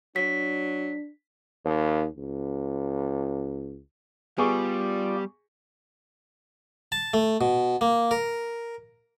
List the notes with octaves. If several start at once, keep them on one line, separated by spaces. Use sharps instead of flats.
F#3 D4 B6
D#2
C#2
G3 B3 F4 G#4 D5 C#6
A5
A3
B2
A#3
A#4